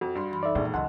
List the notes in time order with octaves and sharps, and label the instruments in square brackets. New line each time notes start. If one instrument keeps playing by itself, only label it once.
[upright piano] F2 [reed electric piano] F#4
[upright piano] G2 C6
[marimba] F#2 E3 B5
[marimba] D#4 A4 [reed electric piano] D5 E5
[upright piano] E1 A#1 D#2 [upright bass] A#2
[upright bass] C#2 [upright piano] F#2 [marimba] D#5 A5 C6 [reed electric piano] F#5